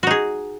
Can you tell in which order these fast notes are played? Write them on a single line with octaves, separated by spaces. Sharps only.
F#4 D#4 G#4